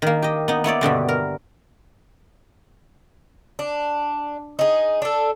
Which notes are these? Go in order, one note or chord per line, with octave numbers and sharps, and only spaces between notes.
D#3 A#3
G4 D#5
B3 D#4
B3 E4 C#5 D5
G2 B2 D3 G3
A#4
D4
D#4 G#4
D4 A4